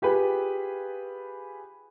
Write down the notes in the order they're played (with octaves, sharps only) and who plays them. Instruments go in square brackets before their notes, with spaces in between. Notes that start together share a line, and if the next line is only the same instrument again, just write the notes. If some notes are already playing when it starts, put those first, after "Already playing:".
[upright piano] F4 G4 G#4 B4